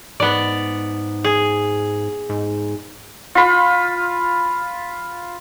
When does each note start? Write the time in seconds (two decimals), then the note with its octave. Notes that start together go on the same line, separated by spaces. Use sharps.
0.20 G#2 B3 D5
1.24 G#4
2.30 G#2
3.35 F4 B5